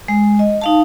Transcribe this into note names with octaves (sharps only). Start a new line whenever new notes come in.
G#3
D#5
D#4 F5 A5